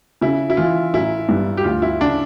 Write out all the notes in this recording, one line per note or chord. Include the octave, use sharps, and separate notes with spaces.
C#3 E4
E4
E3 F4
A1 E4
G2
G4
D2 F4
E4
C#3 D4